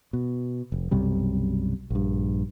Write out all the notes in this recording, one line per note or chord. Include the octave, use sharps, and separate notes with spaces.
B2
F1
B1 F#2 C3 G3
A#1 G2